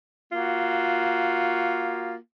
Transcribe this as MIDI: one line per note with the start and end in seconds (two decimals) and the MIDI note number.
0.32 2.16 58
0.32 2.16 65
0.32 2.16 66